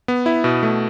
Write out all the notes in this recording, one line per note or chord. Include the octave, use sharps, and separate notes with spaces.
B3
E4
B2
A3